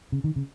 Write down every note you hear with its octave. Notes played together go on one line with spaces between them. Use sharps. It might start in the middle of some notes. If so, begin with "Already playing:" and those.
C#3
D#3
C#3